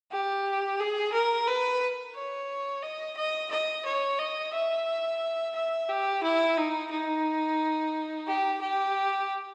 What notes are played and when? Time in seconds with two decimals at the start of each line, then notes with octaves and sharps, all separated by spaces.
0.12 G4
0.80 G#4
1.12 A#4
1.47 B4
2.15 C#5
2.83 D#5
3.17 D#5
3.51 D#5
3.85 C#5
4.19 D#5
4.53 E5
5.56 E5
5.89 G4
6.23 E4
6.57 D#4
6.91 D#4
8.27 G4
8.61 G4